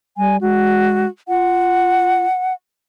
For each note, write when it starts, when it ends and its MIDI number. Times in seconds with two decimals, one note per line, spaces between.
0.17 0.40 55
0.17 0.36 80
0.41 1.05 56
0.41 1.08 66
1.28 2.26 65
1.28 2.53 78